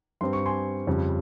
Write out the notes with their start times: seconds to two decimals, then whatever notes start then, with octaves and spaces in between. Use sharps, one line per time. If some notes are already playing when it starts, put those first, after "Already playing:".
0.21 G2 G3 C4 C6
0.33 C#6
0.46 G#5 C6
0.87 F2 C#3 G3